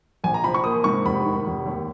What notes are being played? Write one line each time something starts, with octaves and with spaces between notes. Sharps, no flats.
A#1 G#5
A#5
F3 B5
C#6
A#3 D#6
G#2 C#6
F1 B5
D#3
F1
D#2